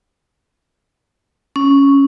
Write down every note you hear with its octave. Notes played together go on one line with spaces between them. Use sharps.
C#4